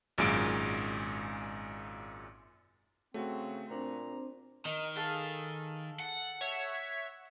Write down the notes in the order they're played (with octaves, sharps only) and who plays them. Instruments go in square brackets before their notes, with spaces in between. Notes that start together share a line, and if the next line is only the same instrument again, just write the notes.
[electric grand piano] G#1 F#2 A#2 G#3 D7
[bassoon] C#3 [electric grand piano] A3 F#4 [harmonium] C4
[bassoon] A#2 [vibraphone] C4 D4 C5 [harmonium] A#5
[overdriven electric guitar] D#3 [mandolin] D#4
[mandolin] G#4 A4 F5
[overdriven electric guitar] F#5
[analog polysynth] C#5 E5